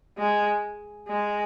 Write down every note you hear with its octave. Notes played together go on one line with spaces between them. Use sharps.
G#3
G#3